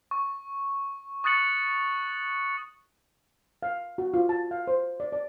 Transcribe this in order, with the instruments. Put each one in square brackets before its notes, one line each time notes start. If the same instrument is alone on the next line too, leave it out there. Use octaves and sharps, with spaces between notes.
[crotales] C#6
C#6 D#6 F#6 A6 C#7 F#7
[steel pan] F5
F#4
F4
A5
F5
C5
D5
D5